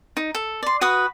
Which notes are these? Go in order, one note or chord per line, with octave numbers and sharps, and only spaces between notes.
D#4
A4
D5 C6
F#4 B4 D#6